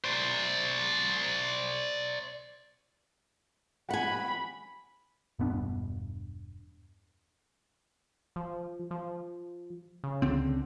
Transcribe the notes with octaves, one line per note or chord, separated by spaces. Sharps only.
C5 D5
F#5 G#5 B5
E1 G2 B3 D4
F3
F3
C#3
C#2 D3 C4